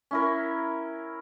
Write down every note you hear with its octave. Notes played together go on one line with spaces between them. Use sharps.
C#4 E4 A#4